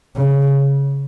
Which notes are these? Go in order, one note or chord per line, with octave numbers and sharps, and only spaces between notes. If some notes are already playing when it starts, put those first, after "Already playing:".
C#3